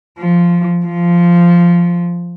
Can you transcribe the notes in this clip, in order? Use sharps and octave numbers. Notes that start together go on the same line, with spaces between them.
F3
F3